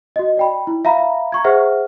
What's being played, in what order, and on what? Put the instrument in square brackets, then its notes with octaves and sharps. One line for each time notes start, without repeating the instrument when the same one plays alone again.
[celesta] F#4 D#5
D5 G5 B5
E4
E5 F5 A#5 B5
A#5 C#6 G#6
G#4 C5 E5 F#5 F6